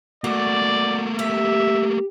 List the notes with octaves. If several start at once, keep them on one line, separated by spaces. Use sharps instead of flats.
A3 A#3 F#4 D5
G4 E5